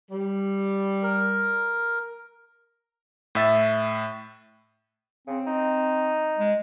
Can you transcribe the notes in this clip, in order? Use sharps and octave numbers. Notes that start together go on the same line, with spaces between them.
G3
A#4
A2 E5 A6
C#3 C4
D#4
G#3